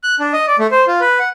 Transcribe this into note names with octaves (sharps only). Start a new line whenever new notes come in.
F#6
D4
D#5
D5
A3
C5
F4
B4
F#5